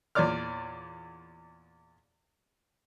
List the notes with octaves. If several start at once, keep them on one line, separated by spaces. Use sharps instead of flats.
E2 A#2 C#5 D5 D6 F6